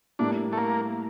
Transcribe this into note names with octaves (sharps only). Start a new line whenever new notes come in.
A2 G3 A#3 D4 E4
A3
A#3